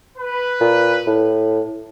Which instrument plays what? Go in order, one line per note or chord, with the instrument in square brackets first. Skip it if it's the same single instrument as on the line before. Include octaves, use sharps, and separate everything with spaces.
[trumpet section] B4
[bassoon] A#2
A2